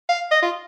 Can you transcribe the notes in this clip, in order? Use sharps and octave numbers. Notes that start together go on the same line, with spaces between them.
F5
D#5
F4